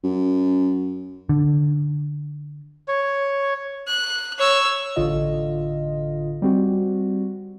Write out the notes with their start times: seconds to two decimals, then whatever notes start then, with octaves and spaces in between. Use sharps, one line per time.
0.04 F#2
1.29 D3
2.88 C#5
3.87 F#6
4.38 C#5 E6
4.96 A1 D3 F4 D#5
6.42 G3 C4 F#4